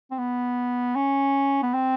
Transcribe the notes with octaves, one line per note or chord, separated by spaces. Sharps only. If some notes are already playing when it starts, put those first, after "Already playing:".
C4
B3
C#4
B3
C4